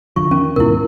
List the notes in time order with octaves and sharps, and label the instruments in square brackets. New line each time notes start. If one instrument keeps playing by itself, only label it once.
[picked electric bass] E2 D3 F3 [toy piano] C#6
[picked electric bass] D#3 [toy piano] C#4
[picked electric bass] D#2 G#2 B2 [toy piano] E4 A#4